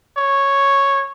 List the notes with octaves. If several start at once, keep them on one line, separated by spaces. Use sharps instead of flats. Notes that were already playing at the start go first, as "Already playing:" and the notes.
C#5